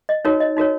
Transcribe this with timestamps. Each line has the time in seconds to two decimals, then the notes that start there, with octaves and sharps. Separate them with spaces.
0.09 D#5
0.25 D#4 F#4 A#4 C#5
0.40 D#5
0.57 D#4 F#4 A#4 C#5